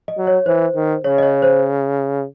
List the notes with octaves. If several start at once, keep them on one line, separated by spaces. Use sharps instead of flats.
D#5
F#3
C#5
E3 C5
D#3
C#3 C#5
D#5
C#5
C5